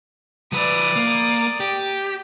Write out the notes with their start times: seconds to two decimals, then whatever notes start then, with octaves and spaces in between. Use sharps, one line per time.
0.52 F3 B4 D5 D#6
0.96 A#3
1.60 G4